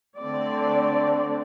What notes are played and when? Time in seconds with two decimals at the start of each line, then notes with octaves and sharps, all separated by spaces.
0.18 D3 A3 C4 D5